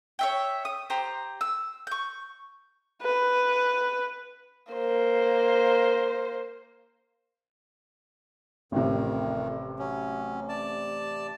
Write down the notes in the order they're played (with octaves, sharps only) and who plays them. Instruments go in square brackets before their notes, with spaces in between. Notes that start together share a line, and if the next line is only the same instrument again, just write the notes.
[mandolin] C#5 E5 G5
D#6
G4 C5 A#5
E6
C#6 G6
[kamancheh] B4
A#3 C5
[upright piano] A1 C3 [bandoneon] F2 D#3
[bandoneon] F#3 C#4
D5 A5